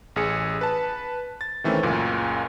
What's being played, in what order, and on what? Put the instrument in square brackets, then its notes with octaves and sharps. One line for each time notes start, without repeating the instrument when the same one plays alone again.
[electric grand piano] A1 G#4 C#7
B4 A5
A6
D#3 E3 A3 C4 C#4
C#2 F#2 A#2